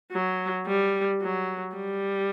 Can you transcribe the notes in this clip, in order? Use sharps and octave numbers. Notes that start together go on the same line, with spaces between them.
F#3
G3
F#3
G3